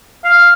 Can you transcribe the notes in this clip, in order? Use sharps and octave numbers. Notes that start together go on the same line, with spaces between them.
F5